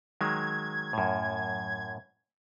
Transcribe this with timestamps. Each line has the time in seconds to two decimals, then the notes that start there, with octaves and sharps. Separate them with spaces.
0.21 D#3 F#3 G#3 G#6
0.93 F#2 A2